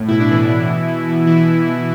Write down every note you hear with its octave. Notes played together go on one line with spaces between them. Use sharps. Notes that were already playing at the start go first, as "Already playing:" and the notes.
Already playing: A2
B2 E4
D4
B2 E3 E4
B2
B2
B2
B2
B2 E3 E4
B2
B2